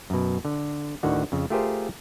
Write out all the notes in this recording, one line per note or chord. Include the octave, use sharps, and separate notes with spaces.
F#2 B2
D3
D2 A2 D3 D#3 F#4 F#5
F2 C#3
A3 F4 G4 G#4 A#4 C5